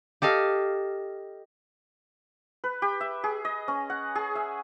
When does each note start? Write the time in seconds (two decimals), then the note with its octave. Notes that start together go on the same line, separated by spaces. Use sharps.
0.22 G4 A4 D#5 F5
2.64 B4
2.82 G4
3.01 E5
3.24 G#4
3.45 D#5
3.68 C#4
3.90 F#5
4.15 G#4
4.35 E5